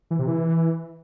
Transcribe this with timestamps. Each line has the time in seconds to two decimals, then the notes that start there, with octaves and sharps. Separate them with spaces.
0.11 E3
0.19 C3
0.27 E3